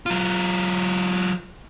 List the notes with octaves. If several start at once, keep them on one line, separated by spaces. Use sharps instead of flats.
F#3 F4